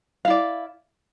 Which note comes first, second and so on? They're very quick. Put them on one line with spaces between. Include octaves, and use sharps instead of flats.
F5 E4 D5